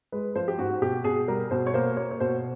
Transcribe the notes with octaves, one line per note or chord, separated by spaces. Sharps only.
G#3 B4
F3 C5
G4
G#2 F#4
B2 G4
B2 G#4
G3 A#4
B2 C5
C#5
A#3 C5
A#3 C#5
C#5
B2 C5